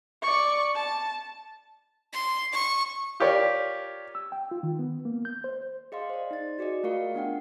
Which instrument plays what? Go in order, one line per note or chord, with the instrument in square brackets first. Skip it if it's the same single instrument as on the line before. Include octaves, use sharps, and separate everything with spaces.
[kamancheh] D5 C#6
A5
[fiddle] C6
C#6
[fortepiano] F4 G4 A#4 C#5 D5
[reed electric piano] E6
G5
F4
D#3
B3
A#3
G6
C5
[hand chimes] G#4 D#5 F5 C6
C5 D5
D#4 A6
F#4 G#4 D5 D#5
A3 F4 A#4 F5 C#6 C#7
B3 D4 F#5 G5